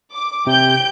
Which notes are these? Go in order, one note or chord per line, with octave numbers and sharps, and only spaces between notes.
D6
C3 G4 G6 D7